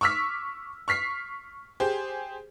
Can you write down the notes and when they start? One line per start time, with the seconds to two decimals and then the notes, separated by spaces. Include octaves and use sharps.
0.01 C#6 D6 E6 F6 B6
0.88 C#6 F6 B6 C7
1.80 G4 G#4 C5